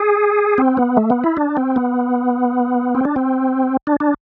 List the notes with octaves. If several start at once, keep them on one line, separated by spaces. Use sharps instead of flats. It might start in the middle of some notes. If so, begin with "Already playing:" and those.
Already playing: G#4
C4
B3
A3
B3
E4
D4
C4
B3
C4
D4
C4
D4
D4